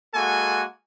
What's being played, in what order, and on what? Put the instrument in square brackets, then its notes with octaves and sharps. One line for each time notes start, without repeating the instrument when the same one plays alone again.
[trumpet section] G#3 A#3 F#4 A4 F#5 G#5